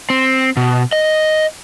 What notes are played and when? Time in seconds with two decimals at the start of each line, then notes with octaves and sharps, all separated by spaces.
0.10 C4
0.57 B2
0.92 D#5